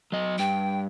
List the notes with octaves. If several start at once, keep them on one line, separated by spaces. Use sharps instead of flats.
F#3 D#5
G2 G5